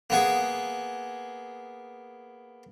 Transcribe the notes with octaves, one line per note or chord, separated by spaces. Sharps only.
A#3 B3 G#4